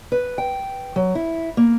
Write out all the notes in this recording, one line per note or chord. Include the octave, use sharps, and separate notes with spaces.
B4
G5
F#3
E4
A#3